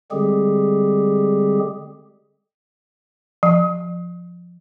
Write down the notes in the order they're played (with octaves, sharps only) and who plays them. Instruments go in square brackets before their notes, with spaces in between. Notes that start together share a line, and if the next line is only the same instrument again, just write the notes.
[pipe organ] D3 G3 G#3 C4 G4 G#4
[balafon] F3